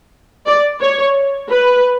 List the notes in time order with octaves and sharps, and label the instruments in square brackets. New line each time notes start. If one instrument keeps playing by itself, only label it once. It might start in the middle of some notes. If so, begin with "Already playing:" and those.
[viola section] D5
C#5
B4